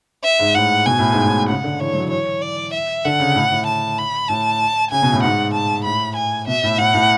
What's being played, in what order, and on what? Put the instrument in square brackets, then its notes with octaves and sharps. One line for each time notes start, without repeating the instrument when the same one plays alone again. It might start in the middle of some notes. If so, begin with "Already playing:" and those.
[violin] E5
[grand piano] G#2
[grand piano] A2 [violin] F#5
[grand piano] B2 [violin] G#5
[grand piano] A2
G#2
A2
[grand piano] C#3 [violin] F#5
[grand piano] D3
[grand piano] E3 [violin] C#5
[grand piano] F#3
[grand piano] E3 [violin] C#5
[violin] D5
E5
[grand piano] D3 [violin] F#5
[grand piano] C#3
A2
A2
[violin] A5
B5
[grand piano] A2 [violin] A5
[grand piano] C#3 [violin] G#5
[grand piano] B2
A2
[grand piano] G#2 [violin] F#5
[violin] A5
[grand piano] A2 [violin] B5
[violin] G#5
[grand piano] B2 [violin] E5
[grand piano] A2
[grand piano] A2 [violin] F#5
[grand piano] A2